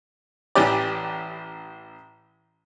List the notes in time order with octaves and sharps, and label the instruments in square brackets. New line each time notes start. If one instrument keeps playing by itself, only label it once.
[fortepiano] A1 E3 C#4 G4 D5